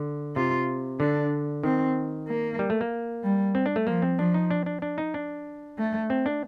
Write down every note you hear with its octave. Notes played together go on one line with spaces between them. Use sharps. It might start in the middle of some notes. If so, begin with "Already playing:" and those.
Already playing: D3
C3 F4
D3 D4
D#3 C4
A#3
G3
A3
A#3
G3
C4
D4
A3
F3 A#3
C4
F3 D4
D#4
D4
D4
D4
D#4
D4
A3
C4
D4